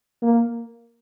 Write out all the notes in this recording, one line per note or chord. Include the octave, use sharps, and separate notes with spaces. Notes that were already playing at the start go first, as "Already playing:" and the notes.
A#3